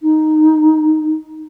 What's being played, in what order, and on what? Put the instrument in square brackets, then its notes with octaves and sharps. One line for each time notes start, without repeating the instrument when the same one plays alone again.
[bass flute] D#4